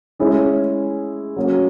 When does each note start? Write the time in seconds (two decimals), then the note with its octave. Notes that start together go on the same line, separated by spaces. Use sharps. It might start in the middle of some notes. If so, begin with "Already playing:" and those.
0.19 G#3 C#4 E4 G#4
1.36 F#3 A#3 C#4